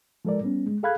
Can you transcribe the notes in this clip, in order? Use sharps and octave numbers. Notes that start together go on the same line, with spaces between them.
F3 G#3 A4 A#4 D5
G3 B3 C#4
G#3
G#4 A4 F5 B5 F#6 G#6